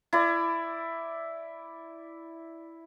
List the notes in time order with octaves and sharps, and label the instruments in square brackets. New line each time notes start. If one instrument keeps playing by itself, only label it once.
[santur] E4 D5